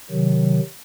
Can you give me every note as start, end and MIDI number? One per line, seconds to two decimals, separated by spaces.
0.11 0.60 48
0.11 0.60 51
0.11 0.60 54